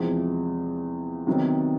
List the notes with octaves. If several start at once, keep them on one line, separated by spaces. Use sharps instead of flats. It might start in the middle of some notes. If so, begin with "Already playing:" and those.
Already playing: E2 C3 F3 G#3
C3 D#3 F#3 B3